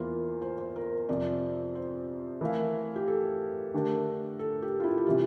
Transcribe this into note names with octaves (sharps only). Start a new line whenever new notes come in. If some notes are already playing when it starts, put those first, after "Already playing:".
Already playing: E2 E3 A#3 F4 C5
C5
C5
A#4
F2 C3 F3 D5
C5
E3 A3 E4 A#4 F5
G4
A4
D3 A3 D4 G4 A#4
A4
G4
F4
E4
G4
C3 E3 G3 F4